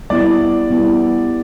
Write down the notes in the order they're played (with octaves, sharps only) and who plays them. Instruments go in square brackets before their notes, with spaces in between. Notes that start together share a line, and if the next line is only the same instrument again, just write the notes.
[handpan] G3 B3 E4 [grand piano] D5
[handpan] G3 B3 E4